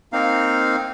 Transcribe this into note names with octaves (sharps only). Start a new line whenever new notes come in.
A#3 C4 D#4 F5